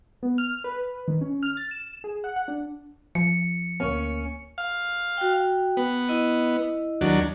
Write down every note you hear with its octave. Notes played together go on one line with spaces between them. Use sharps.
B3
F6
B4
D#3
C#4
F6
A6
E7
G#4
F#5
F#5
D4
F3 C#7
D2 A#3 C#4
F5
F#4 G5
B3
E4 D#5
D#2 F#3 D4